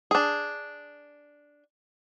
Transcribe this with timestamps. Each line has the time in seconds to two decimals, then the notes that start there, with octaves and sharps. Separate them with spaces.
0.11 D4 G#4